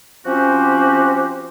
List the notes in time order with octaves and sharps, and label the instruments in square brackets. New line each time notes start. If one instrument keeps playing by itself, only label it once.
[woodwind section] F3 C4 C#4 F#4 G4 C5